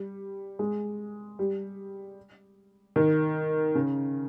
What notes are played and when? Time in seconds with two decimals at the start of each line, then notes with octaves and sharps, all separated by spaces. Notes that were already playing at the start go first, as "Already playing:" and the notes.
Already playing: G3
0.59 G#3
1.39 G3
2.96 D#3
3.75 C#3